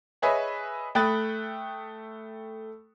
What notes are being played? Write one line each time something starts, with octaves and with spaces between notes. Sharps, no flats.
G#4 B4 C#5 D#5 E5 G#5
A3 G5 B5 D#6 F#6 A6